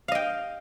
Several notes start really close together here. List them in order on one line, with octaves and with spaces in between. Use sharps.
F5 D#5 G5